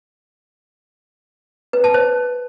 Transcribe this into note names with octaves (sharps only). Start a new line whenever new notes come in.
B4
A5
C5